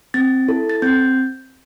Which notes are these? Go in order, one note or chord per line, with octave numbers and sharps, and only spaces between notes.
C4 A6
E4 A4
A6
C4 G6